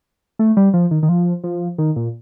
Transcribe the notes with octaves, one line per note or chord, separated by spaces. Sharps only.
A3
G3
F3
D#3
D#3
F3
F3
D#3
A#2